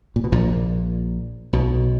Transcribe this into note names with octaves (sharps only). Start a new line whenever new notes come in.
A#2
B2
A#1 A#2
B1 B2